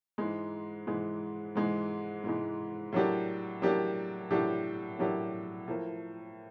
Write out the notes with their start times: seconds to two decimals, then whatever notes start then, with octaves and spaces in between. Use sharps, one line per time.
0.18 G#2 E3 G#3
0.87 G#2 E3 G#3
1.55 G#2 E3 G#3
2.24 G#2 E3 G#3
2.92 A2 F#3 A#3 D4 G4
3.62 A2 F#3 A#3 D4 G4
4.31 A2 F#3 A#3 D4 G4
4.99 A2 F#3 A#3 D4 G4
5.68 A2 F3 A#3